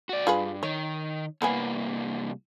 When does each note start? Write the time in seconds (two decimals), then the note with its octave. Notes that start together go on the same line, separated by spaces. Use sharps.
0.09 F#4 D5
0.27 G2 F4 G#4 B4
0.63 D#3 C#5
1.42 C2 A#3 B3 B4 G#5